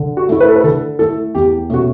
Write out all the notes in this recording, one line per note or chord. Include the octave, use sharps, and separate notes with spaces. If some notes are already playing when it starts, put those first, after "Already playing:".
Already playing: D3
F#4
A3 E4
B4
A4
B4
D3 A4
A3 E4 A4
E2 G4
B2 A3 C#4 F#4